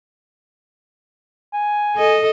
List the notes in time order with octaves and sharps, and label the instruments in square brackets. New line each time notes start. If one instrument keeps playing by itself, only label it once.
[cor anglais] G#5
[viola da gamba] A4 D#5